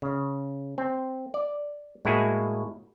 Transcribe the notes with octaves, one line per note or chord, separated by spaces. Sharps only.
C#3
C4
D5
A2 G#3 A#3 E4 F#4 G#4